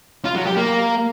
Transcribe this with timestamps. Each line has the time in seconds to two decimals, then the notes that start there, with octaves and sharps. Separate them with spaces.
0.25 F4
0.35 F#3
0.46 G4
0.57 A#3